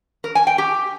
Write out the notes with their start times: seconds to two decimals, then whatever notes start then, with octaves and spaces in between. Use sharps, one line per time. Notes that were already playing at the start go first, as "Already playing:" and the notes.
0.24 A#4
0.35 G#5
0.47 G5
0.58 G4